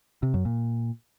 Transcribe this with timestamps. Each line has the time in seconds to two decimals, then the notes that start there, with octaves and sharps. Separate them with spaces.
0.23 C3
0.34 F#2
0.45 A#2